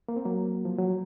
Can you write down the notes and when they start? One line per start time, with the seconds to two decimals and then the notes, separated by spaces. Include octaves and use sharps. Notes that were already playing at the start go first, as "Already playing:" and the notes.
0.08 A#3
0.16 C4
0.25 F#3 A#3
0.65 F3
0.79 F#3